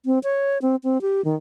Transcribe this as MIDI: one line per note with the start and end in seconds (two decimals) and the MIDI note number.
0.05 0.19 60
0.23 0.58 73
0.62 0.76 60
0.84 1.01 60
1.01 1.24 67
1.25 1.35 51